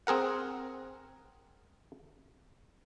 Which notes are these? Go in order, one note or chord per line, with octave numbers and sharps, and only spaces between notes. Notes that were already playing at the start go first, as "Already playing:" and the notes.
C4 G#4 A#4 F#5